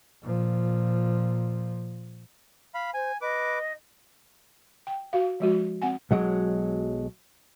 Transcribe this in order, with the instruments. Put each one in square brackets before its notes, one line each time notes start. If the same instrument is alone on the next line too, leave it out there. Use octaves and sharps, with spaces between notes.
[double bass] A#2 F3
[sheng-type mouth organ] F5 B5
[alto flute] C5 [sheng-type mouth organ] G#5
[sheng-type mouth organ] B4 D6 [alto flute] D#5
[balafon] G5
F#4 F5
F3 G#3 F#4
C4 F#5 G#5
[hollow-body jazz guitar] B1 F#3 G#3